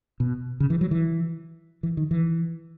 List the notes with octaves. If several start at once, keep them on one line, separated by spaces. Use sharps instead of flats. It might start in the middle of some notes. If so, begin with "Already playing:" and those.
B2
C#3
E3
F#3
E3
E3
D#3
E3